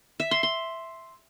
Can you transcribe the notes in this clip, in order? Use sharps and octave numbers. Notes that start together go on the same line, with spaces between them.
E5
C6
C6